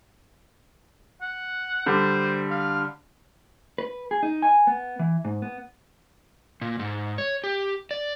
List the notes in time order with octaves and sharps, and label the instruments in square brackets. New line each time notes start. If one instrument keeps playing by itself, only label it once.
[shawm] F#5
[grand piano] D3 G3 [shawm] C5
[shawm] F5
[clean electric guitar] B4
G#4
D#4
G#5
B3
E3
G#2
B3
[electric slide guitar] A#2
G#2
C#5
G4
D5